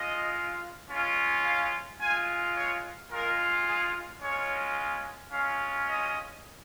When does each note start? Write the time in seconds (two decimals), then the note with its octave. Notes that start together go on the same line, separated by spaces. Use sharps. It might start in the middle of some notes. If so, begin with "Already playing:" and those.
Already playing: G#3 F4 D#5
0.90 G#3 C#4 F4
1.45 F5
2.00 G#3 F4 G#5
2.55 C#5
3.10 G#3 F4 A#4
3.66 G#4
4.21 G#3 C#4 F4 C#5
5.31 G#3 C#4 F4 F5
5.86 D#5